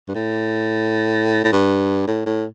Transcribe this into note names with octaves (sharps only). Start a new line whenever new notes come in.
G2
A2
A2
G2
A2
A2